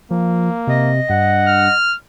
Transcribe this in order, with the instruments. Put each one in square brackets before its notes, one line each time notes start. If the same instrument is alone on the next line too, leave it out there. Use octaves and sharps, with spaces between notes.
[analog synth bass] F3 [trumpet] A#3
[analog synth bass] C3 [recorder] D#5
[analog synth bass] G2 [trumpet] F#5
[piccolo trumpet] F6